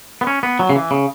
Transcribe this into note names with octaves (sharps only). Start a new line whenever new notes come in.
B3
C#4
B3
F#3
C#3
E3
C#3